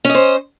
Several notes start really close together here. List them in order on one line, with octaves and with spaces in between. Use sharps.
C#4 D#5 C5